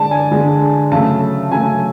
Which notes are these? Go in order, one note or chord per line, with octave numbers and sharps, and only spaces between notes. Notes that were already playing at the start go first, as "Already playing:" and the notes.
Already playing: D3 G#3 D5 A5
G#5
D3 G#3
C#3 F#3 A3 A5
C#3 F#3 A3 G#5